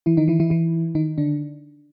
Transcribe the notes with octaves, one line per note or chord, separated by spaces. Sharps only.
E3 E4
D#3 D#4
E3 E4
E3 E4
E3 E4
D#3 D#4
D3 D4